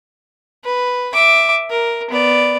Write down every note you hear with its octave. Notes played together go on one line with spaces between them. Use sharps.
B4
E5 D6
A#4
B3 D5